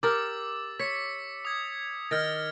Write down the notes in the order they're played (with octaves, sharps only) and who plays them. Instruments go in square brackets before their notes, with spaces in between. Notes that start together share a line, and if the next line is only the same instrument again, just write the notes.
[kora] G4 A#4 [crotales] D6 E6 A6
[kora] C#5 [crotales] B6 C#7
[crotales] D#6 G#6
[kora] D#3 [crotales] F6 A6 A#6